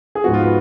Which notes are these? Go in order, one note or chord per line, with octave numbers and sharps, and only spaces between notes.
G#4
G#2 F3 B3 F#4
F4
B4